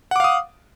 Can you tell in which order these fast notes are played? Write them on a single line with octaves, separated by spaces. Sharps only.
F#5 D6 F5 D#6